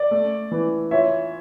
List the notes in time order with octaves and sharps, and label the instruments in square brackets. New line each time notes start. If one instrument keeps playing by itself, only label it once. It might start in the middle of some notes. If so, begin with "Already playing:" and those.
Already playing: [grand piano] D5
[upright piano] A3
E3
[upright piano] F4 [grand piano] C#5 E5